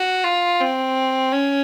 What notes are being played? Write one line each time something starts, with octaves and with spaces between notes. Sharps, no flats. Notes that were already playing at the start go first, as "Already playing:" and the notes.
Already playing: F#4
F4
C4
C#4